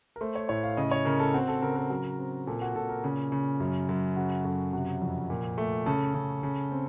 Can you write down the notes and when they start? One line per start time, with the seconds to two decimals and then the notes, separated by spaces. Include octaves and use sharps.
0.16 A#4
0.21 A3 C5
0.35 C#5
0.49 A2 C#5
0.64 F5
0.77 C#3 D#5
0.91 C#5
1.05 C#3 A#4
1.19 A4
1.34 C4 F#4
1.48 A4
1.62 C#3 A#4
1.76 A#4
1.90 F#3
2.19 C4
2.47 A#2 A4
2.62 F#4
2.75 A#2 A4
2.89 A#4
3.04 C#3
3.32 C#3
3.60 F#2
3.89 F#2
4.16 C#3 F#4
4.45 F#2 A4
4.73 C3 F#4
5.02 F2
5.30 A#2
5.58 A3
5.86 C#3 A4
6.14 C#3
6.43 C#3
6.72 C4